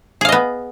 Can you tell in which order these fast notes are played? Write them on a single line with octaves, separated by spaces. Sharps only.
G#4 F5 D#5 B3